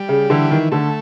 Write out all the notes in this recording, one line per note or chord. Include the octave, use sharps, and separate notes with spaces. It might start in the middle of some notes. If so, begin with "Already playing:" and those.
Already playing: G3
C#3
D3 E3
D#3
D3 A3